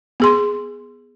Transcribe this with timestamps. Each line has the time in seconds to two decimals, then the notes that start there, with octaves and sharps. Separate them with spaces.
0.20 B3 G#4 C6